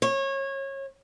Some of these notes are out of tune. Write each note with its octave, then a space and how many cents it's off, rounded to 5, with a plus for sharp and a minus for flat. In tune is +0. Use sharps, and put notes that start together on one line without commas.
C#5 -25